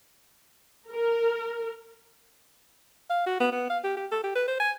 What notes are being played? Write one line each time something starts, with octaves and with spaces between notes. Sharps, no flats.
A#4
F5
F#4
B3
B3
F5
G4
G4
A4
G4
B4
C5
G#5